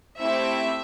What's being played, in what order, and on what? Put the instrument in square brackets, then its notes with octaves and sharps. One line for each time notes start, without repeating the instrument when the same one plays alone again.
[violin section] A3 C4 E4 G4 E5